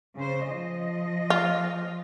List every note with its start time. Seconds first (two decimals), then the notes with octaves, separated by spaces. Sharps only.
0.17 C#3 C5
0.48 F3 D#5
1.30 F4